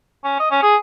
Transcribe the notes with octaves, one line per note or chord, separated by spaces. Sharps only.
C#4
D#5
C#4
G#4